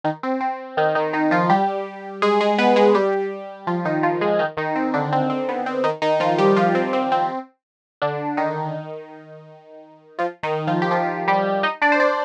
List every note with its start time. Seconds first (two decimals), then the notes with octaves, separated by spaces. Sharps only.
0.04 D#3 D#4
0.23 C4
0.41 C4
0.77 D#3 D#4
0.95 D#3 D#4
1.13 D#3 D#4
1.31 F3 F4
1.50 G3 G4
2.22 G#3 G#4
2.41 G#3 G#4
2.58 B3 B4
2.76 G#3 G#4
2.95 G3 G4
3.67 F3 F4
3.85 D#3 D#4
4.03 F3 F4
4.21 G#3 G#4
4.39 D#3 D#4
4.57 D#3 D#4
4.75 C4
4.94 D3 D4
5.13 C4
5.30 C4
5.49 B3
5.66 C4
5.84 D#3 D#4
6.02 D#3 D#4
6.20 F3 F4
6.38 G3 G4
6.56 F3 F4
6.75 C4
6.93 C4
7.12 C4
8.02 D3 D4
8.37 D#3 D#4
10.19 F3 F4
10.43 D#3 D#4
10.67 F3 F4
10.82 G4
10.91 F3 F4
11.28 G3 G4
11.63 D#4 D#5
11.82 D4 D5
11.92 C5
12.00 D4 D5